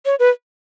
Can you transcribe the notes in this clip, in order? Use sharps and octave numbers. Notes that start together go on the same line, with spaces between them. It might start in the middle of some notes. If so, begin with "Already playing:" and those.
C#5
B4